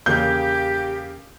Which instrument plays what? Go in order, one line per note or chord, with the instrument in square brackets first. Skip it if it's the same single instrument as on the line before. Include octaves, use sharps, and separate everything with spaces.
[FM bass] E2 [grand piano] C#3 A#3 [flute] G4 [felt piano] G6